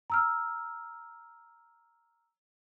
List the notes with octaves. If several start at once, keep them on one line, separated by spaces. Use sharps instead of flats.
A#5 E6 F6